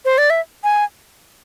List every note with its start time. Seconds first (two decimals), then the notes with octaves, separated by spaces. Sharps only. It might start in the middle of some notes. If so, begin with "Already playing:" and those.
0.05 C5
0.18 D5
0.30 E5
0.64 G#5